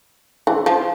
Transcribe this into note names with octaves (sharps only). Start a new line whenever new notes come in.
E3
F3